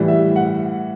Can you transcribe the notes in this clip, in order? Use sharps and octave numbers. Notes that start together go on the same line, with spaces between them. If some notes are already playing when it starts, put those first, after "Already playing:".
Already playing: A2 E3 G3
E5
F#5